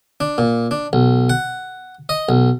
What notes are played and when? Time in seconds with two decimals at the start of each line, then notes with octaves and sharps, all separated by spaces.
0.20 D4
0.38 A#2
0.71 D4
0.93 B1
1.29 F#5
2.09 D#5
2.29 B1